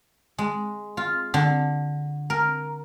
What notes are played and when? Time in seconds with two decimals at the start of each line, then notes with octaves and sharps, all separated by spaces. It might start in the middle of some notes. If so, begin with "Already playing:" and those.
0.38 G#3
0.97 F4
1.34 D3
2.30 A#4